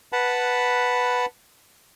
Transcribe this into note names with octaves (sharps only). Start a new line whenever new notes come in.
B4 F#5 A5 B5